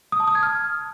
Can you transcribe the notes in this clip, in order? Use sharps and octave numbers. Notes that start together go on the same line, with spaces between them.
D#6
A5
D#6
G#6
F6